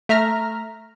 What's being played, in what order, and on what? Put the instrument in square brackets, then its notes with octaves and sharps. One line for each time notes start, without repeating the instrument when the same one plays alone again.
[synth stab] A3 E5 A#5 F6 A#6